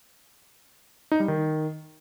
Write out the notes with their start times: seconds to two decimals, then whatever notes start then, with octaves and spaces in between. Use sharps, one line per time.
1.12 D#4
1.20 G3
1.28 D#3